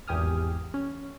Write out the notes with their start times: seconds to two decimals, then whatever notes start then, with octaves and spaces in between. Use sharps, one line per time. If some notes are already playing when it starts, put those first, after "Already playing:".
0.08 G#1 E2 G4 G#5 D#6 F6
0.74 C#4